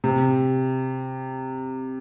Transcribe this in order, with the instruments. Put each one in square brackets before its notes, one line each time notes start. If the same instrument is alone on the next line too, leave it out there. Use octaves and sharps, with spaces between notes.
[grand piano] C3